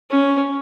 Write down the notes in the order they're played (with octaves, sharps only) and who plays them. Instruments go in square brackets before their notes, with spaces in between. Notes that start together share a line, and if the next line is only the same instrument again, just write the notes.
[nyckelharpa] C#4